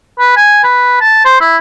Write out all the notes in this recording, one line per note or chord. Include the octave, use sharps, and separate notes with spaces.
B4
G#5
B4
A5
C5
E4